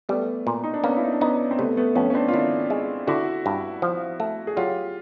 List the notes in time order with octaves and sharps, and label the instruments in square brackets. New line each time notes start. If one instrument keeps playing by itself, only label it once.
[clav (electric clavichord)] G3 [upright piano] A3 B3
[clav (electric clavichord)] A#2
[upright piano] D#4
D4
[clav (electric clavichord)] A#3 [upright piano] B3 C#4
[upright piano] E4
D#4
D4
[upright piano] B3 C#4 [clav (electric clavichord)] D#4
[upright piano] C4
[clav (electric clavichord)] C3 [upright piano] A3 B3
[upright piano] A3 B3
[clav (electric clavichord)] F2 [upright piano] B3 C#4
[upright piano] C#4
C4 D4
F4
[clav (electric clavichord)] D#3 [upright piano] D4 E4
[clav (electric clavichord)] G#3
[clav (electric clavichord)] D3 [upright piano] E4 F#4
[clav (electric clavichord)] G2
F3
A3
[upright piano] G#4
[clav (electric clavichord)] F#3 [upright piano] F4 G4